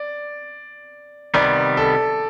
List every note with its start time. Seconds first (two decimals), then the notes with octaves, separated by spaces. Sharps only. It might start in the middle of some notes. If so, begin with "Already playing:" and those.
Already playing: D5
1.34 C3 D#3 G3 B3 D5
1.77 A4